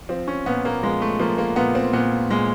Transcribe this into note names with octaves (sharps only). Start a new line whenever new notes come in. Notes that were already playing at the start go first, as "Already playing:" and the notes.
F3 C4
C#4
A#2 B3
A#3
F3 G#3
A3
F3 A#3
A#3
A#2 B3
C4
A#2 B3
A#2 G#3